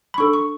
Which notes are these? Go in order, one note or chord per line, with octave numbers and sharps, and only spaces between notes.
B5
D4 A4 C#6
C#6